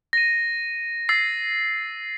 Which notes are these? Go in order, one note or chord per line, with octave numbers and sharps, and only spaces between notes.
A#6 D#7
E6 A6 C7